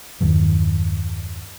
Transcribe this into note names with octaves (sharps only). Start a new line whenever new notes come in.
E2 G2 D#3 F#3